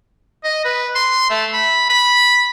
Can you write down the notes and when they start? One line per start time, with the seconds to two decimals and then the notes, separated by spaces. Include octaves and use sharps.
0.44 D#5
0.65 B4
0.95 C6
1.30 A3
1.53 B5
1.89 B5